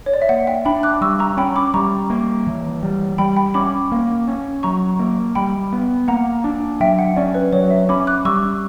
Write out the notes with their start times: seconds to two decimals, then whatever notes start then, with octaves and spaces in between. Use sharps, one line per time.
0.06 C#5
0.14 D5
0.22 E5
0.29 A#3 F#5
0.47 E5 G5
0.65 D4 G5 B5
0.83 D6 F#6
1.01 G3 C#6 E6
1.19 A#5 C#6
1.37 C#4 G5 B5
1.56 B5 D6
1.74 G3 A#5 C#6
2.10 A#3
2.47 E3
2.83 G3
3.18 G3 G5 B5
3.36 G5 B5
3.54 C#4 B5 D6
3.92 A#3
4.28 C#4
4.63 F#3 A#5 C#6
4.99 A#3
5.35 G3 G5 B5
5.72 B3
6.08 A#3 F#5 A#5
6.44 D4
6.80 F#3 E5 G5
6.99 F#5
7.16 C#4 D5
7.34 B4
7.53 F#3 C#5
7.71 E5
7.89 C#4 B5 D6
8.07 D6 F#6
8.25 G3 C#6 E6